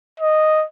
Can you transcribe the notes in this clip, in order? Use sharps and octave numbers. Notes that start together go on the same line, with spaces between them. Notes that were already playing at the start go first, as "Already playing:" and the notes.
D#5